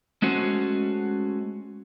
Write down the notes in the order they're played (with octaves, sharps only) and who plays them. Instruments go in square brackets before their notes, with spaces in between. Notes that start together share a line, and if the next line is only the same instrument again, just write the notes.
[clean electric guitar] G#3 A3 C#4 F#4 C5